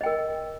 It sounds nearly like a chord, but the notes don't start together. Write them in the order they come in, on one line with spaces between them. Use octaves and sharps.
D#5 G5 A#4